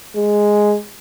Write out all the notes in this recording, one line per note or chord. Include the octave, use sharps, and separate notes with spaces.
G#3